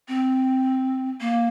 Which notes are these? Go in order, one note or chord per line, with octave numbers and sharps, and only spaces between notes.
C4
A#3